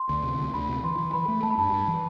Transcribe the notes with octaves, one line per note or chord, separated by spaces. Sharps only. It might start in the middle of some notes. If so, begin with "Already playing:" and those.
Already playing: C6
D2
C3
D2
D2 B5
C3
E3 C6
E3
E3 B5
A3
A3 A5
B5
G2 A5
G2
E3